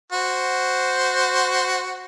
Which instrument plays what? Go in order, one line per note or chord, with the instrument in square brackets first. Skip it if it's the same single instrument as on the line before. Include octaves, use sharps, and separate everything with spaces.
[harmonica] F#4 C5